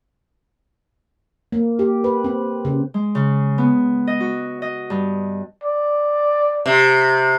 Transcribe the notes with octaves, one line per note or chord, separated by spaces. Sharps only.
A#3
G4
B4
C4
C#3
G#3
C#3
B3
D#5
F#4
D#5
G2
D5
C3